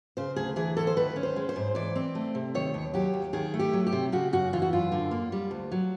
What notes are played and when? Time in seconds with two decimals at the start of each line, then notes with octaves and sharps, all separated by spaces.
0.17 C#3 C5
0.36 D2 G#4
0.56 E3 G#4
0.77 D2 A4
0.87 C5
0.97 D#3 B4
1.16 C#4
1.23 C5
1.36 G#3
1.49 C5
1.56 G#2
1.75 E3 D5
1.96 C4
2.15 A3
2.35 C3
2.55 D#3 C#5
2.74 D#2
2.94 F#3 G4
3.14 D#2
3.33 D#3 G#4
3.54 A3
3.59 G4
3.73 F#3
3.87 G4
3.92 C3
4.12 C#3 F#4
4.33 F#2 F#4
4.53 E3 F4
4.62 F#4
4.73 F#2 F4
4.92 D3
5.11 A#3
5.32 G3
5.51 D2
5.72 F#3